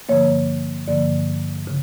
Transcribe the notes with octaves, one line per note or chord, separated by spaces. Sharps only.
G2 D3 F3 A#3 C#5
G2 D3 F3 A#3 D5
C#3